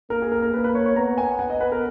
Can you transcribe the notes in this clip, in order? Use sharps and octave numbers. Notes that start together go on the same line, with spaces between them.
A#3 A#4
G#4
A#4
A#4
A#3 B4
B4
C#5
C#5
B3 A#5
G#5
F#5
D#5
B4
A#4